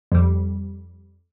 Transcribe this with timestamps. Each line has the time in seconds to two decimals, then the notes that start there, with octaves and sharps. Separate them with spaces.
0.12 F2 G3